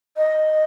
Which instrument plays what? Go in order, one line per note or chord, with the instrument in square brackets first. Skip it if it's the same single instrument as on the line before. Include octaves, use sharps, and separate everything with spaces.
[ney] D#5